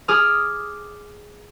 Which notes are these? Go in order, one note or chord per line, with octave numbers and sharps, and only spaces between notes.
G#4 D6 D#6 F6